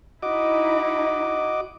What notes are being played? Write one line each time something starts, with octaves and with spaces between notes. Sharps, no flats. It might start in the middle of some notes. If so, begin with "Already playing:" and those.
D#4 E4 F#4 D#5 D6